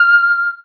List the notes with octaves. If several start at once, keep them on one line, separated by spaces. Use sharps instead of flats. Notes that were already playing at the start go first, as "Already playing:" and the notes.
Already playing: F6